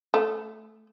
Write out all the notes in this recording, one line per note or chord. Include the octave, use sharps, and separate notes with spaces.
A3